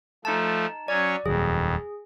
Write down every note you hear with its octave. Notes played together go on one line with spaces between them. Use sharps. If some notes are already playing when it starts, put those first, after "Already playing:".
F3 A3 D#4 A5
F#3 C#4 C#5 D5
D#1 F2 D#3 F#3 G#4